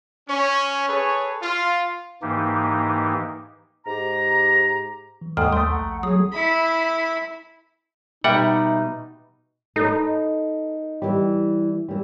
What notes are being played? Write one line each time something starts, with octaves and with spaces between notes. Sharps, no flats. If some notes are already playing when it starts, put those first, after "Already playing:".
C#4
G#4 A4 B4 C#5
F4
G#2 E3 A#3 D#4 G4
G#2 G4 A#5
E3
D#2 G#2 A4 G5 D#6 F6
A3 G5 C6
A#1 F#5 A#5
F#3 G#4 D#6
E4 B5
B2 G3 D#4 E5 F#5 G5
D#4 A4 B4 D#5
E3 G3
E3 G3